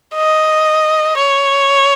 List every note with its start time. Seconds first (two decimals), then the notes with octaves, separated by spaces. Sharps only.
0.15 D#5
1.17 C#5